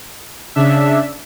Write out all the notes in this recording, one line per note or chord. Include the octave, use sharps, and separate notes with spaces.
C#3 D4 E5